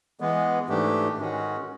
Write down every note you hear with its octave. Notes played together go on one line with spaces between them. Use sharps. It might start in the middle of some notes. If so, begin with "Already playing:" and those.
E3 G#3 B3
G#2 E3 A3 D4 G4
G#2 D#3 G#3 C#4 F#4